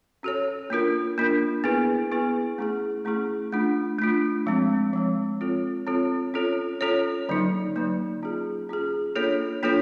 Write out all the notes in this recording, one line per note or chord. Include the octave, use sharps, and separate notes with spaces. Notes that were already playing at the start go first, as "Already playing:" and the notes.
C#4 F#4 A4 C#5
A#3 D4 F4 A#4
A#3 D4 F4 A#4
B3 E4 G#4 B4
B3 E4 G#4 B4
A3 C#4 E4 G#4
A3 C#4 E4 G#4
A3 D4 F4
A3 D4 F4
F3 G#3 C4
F3 G#3 C4
C4 F4 A4 C#5
C4 F4 A4 C#5
C#4 F4 A4 C#5
C#4 F4 A4 C#5
D3 F#3 A#3 D#4
D3 F#3 A#3 D#4
C#4 F4 G#4
C#4 F4 G#4
A#3 D4 F4 A4 C#5
A#3 D4 F4 A4 C#5